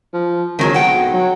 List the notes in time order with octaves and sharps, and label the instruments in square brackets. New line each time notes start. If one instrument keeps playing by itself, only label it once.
[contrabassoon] F3
[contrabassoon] G#1 [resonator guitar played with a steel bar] D#3 F#3 G#4
[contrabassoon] B1 [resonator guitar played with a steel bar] F#5 G5
[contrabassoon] F#3